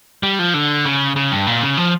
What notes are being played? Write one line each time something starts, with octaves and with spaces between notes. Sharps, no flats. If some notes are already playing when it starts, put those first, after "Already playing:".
G3
F3
D3
C#3
C#3
G2
A#2
C#3
F3